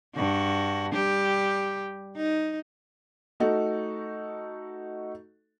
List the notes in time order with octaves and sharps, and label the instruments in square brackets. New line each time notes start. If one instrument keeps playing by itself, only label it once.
[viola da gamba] G2 F#4
G3 G4
D#4
[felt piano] A3 D#4 F#4 A4